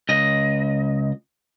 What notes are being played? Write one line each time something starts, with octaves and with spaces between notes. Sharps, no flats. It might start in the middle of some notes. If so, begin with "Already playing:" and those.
C#2 D#5